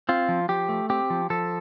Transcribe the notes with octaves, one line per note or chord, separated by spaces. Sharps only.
C4 F4
F3
F3 G4
A3
C4 G4
F3
F3 A4